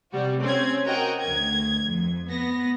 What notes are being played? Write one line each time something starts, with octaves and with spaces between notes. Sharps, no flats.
C3 G3 F#4
C4 C#4 G#6
F#4 A#4 D#5 G5
D2 G#6
F2
B3 A#6